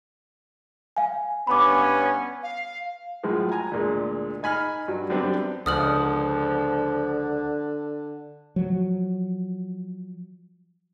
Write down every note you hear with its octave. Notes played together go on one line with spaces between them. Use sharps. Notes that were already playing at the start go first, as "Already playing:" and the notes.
F5 G#5
G2 B3 C#4 B5 D6
F5
F#2 A2 F3 G#3 E4
G#5 A#5
D2 A#2 G#3
D#4 G#5 B5 F6
G2 F#3
F#2 G3 B3 C4 D4
C#2 D3 F3 D#6 F6 F#7
F3 F#3